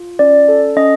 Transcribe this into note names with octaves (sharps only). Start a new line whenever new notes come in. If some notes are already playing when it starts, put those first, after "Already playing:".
Already playing: F4
C#4 D5
A4
C#4 D#5